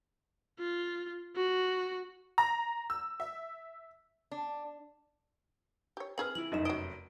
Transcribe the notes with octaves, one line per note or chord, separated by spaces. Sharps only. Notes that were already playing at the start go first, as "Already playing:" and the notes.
F4
F#4
A#5
E6
E5
D4
G4 C#5
C4 G#4 B4 F6 F#7
E3 E4 F#7
F1 F#2 D#4 D#5 E7
F#3 D#5 D7